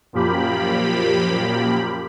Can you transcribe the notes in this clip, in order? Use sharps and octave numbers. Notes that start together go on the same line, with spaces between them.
F#2 A#2 F3 A#3 G4 B5